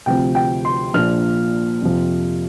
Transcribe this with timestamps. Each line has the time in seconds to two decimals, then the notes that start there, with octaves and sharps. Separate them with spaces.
0.06 D2 C3 F3 C4 G5
0.35 G5
0.65 C6
0.93 A#1 A#2 F3 A#3 D4 F6
1.82 F2 C3 F3